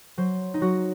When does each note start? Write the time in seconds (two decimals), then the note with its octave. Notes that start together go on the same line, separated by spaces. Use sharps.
0.17 F#3 C5
0.54 D#4
0.61 F#3 F#4